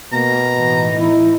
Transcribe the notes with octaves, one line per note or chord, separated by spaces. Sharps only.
B2 A#3 A#5
A2 E3 D#4
E4